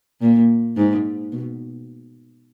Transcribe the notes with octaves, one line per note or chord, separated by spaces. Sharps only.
A#2
G#2
B2